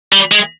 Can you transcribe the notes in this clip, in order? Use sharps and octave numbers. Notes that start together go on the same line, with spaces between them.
G3
G#3